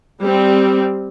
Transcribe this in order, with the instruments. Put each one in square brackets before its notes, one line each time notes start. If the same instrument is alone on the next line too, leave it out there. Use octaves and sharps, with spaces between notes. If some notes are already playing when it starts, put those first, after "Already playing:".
[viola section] G3 C4